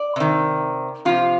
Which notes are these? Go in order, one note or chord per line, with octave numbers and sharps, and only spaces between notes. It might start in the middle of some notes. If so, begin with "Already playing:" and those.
Already playing: D5
C3 D#3
C3 F3 F4